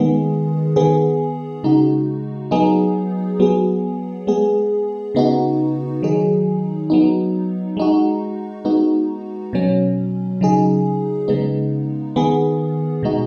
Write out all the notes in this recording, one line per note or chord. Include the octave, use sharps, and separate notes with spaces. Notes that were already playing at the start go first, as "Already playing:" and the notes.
Already playing: D#3 G#3 B3 G#4
D#3 B3 G#4
C#3 G#3 D#4 F#4
F#3 B3 D#4 G#4
F#3 B3 G#4
G#3 B3 G#4
C#3 B3 D#4 F#4
D#3 F#3 D#4 G#4
F#3 B3 D#4
G#3 D#4 F#4
G#3 B3 D#4 F#4
B2 F#3 C#4
C#3 F#3 D#4 G#4
C#3 G#3 B3 D#4
D#3 B3 G#4
B2 G#3 D#4 F#4